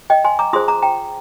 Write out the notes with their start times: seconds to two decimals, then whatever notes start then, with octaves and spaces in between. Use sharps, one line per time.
0.10 D#5 G5
0.24 G#5 C6
0.39 A#5 D6
0.53 F4 G#4 C5 C6 D#6
0.68 A#5 D6
0.82 G5 A#5